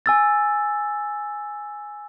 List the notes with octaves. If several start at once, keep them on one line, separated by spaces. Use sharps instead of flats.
G#5 E6 A6